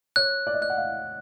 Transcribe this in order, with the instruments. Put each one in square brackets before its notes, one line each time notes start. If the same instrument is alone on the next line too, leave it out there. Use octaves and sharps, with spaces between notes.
[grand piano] C#5 [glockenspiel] F#6
[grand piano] D5
D#5
[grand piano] D5 [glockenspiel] F#6
[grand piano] F#5
F5